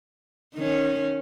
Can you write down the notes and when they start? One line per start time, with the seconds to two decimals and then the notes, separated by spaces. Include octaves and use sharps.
0.55 D#3 C#4